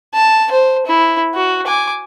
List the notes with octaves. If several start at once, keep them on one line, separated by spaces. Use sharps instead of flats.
A5
C5
E4
F#4
G#5 D6